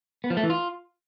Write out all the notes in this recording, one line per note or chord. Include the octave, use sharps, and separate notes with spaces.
B3
F3
A3
E3
F4